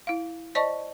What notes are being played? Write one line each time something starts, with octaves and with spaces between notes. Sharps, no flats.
E4 F5
C5 D5 D#5 A5 C#6